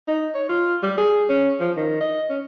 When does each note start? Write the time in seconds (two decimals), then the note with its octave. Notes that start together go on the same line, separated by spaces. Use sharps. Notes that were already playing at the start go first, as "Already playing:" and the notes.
0.08 D#4
0.35 C#5
0.49 F4
0.83 G3
0.97 G#4
1.29 C#4
1.60 F3
1.76 D#3
2.01 D#5
2.29 C#4